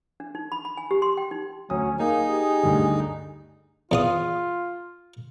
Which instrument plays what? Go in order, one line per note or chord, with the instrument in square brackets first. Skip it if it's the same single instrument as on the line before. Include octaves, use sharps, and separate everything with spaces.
[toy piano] D4
D#4
B5
B5
G#5
G4
C6
G5
D#4
[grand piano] D2 D#6 [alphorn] F#3 [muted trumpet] C#4
[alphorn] A#3 [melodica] D#4 [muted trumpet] G#4 [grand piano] G#5
[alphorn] G4
[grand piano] D2 G2 D3
[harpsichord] E2 F5 D#6 [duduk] F4